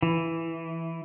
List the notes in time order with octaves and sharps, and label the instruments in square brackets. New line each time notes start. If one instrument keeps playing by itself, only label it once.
[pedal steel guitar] E3